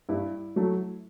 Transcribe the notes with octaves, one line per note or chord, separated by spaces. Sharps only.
G2 E4
F#3 A3